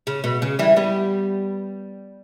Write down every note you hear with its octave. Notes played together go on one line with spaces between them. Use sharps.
C#3
B2
C#3
E3 G3
G3 B3